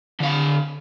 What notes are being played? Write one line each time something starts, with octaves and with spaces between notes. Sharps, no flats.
D3 F5